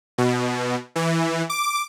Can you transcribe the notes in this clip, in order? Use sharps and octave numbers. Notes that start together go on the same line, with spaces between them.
B2
E3
D6